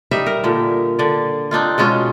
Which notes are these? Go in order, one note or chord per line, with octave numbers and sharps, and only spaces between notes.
G3 D#4 E5
A#4
A#2 D3
D3 D5
C4 D4 D#4 F4
B2 G#3 C#4 F4